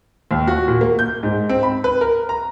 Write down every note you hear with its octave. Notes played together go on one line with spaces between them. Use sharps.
D#2
F#4
A#2
A#3
G6
G#2
C4
B5
B4
A#4
A#5